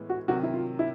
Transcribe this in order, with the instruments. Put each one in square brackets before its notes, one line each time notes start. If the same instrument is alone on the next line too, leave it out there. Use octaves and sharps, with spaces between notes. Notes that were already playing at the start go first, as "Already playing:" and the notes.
Already playing: [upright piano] A2 E3 G#3 B3
[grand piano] F#4
[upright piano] C3 D#3 F#3 [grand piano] F#4
[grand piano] E4
F4
E4